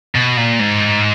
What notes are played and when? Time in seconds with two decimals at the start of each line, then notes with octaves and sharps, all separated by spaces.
0.15 B2
0.37 A#2
0.59 G#2